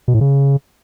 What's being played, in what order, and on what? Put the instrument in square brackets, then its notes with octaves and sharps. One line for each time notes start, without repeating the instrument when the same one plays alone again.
[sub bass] B2
A2
C#3